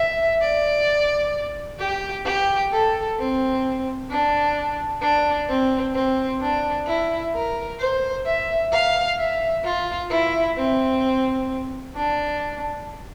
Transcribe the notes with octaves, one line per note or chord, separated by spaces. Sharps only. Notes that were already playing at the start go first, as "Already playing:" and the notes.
Already playing: E5
D5
G4
G4
A4
C4
D4
D4
C4
C4
D4
E4
A#4
C5
E5
F5
E5
F4
E4
C4
D4